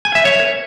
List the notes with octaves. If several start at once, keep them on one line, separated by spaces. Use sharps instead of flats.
G#5
E5
C#5